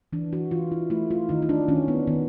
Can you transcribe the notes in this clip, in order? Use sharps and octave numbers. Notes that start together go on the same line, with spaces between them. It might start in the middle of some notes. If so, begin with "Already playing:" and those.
E3 D4
F#4
E3 F4
E4
A3 E4
F4
D#3 D#4
D#4
D4
D#3 C#4
B3
D#3 B3